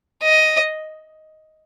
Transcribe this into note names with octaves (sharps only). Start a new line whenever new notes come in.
D#5